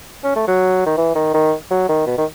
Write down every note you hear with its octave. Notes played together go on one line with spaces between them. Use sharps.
C#4
A3
F#3
D#3
E3
D#3
D#3
F#3
D#3
B2
D#3